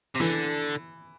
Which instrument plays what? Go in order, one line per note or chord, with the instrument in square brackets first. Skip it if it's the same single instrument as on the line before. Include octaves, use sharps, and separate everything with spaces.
[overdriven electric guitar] C3
[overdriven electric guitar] D3 [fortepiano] E3